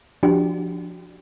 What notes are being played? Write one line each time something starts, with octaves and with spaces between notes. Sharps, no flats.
F3 D4 F#4 G4